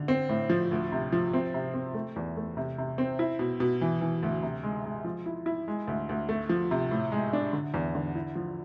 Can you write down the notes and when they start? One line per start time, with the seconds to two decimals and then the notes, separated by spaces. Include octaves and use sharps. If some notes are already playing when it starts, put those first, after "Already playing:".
Already playing: D3
0.08 C4
0.29 A2
0.50 F3
0.71 D2
0.92 C3
1.13 F3
1.33 C4
1.54 C3
1.74 C4
1.94 A3
2.16 E2
2.37 A3
2.57 C3
2.78 C3
2.98 C4
3.19 E4
3.39 B2
3.60 B2
3.81 E3
4.01 E3
4.23 D2
4.43 C3
4.63 G#3
4.85 G#3
5.05 F3
5.26 E4
5.46 E4
5.68 G#3
5.87 D2
6.09 D2
6.29 A3
6.49 F3
6.71 C3
6.91 A2
7.12 G#3
7.33 D4
7.53 D3
7.74 E2
7.95 D3
8.15 E4
8.35 F3